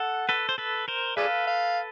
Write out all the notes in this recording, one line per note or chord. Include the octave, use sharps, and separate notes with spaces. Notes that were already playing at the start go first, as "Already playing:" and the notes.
Already playing: A4 F#5
A4 B4
C5
A4 B4
A#4 C5
G#4 A4 B4 D5 F5
F5